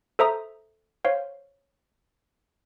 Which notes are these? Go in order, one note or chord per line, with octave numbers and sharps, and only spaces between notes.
A4 C5 E5 A#5 D#6
C5 C#5 F5